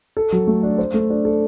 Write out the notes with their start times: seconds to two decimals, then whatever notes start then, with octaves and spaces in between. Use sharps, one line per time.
0.17 A4
0.32 F#3
0.47 A3
0.63 D4
0.78 C5
0.94 A3
1.10 D4
1.25 A4